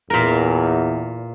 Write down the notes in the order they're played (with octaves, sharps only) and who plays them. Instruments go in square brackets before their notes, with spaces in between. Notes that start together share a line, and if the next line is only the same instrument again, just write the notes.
[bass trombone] E2 [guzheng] A#2 A#4